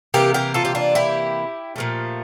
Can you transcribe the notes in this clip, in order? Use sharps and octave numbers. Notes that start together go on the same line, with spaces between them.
C3 E3 A#3 G4 A#4
G4 A#4
F4 A4
G4
D4 F4
E4 G4
A#2 F3 A3